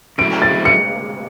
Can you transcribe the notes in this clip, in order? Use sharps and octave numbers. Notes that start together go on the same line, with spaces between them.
C#3 F#3 A3 E4 D7
A6
C#7